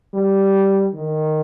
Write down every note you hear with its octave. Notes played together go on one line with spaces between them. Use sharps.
G3
D#3